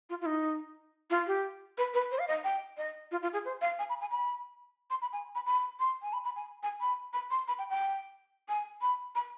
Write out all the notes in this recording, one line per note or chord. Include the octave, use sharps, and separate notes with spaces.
F4
F4
D#4
F4
G4
B4
B4
C5
F5
D#5
G5
D#5
F4
F4
G#4
C5
F5
G#5
B5
G#5
B5
C6
B5
G#5
B5
B5
C6
G#5
B5
B5
G#5
G#5
B5
B5
C6
B5
G5
G5
G#5
B5
B5